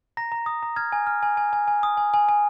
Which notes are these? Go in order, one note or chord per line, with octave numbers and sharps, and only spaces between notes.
A#5 A#6
A#5
D#6
A#5
F6 G#6
G#5
F6
G#5
G#5
G#5
G#5
D#6
G#5
G#5
G#5